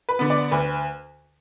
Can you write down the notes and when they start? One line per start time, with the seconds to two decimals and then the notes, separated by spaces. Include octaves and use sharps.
0.09 B4
0.19 D3 B3
0.30 D5
0.51 D2 B4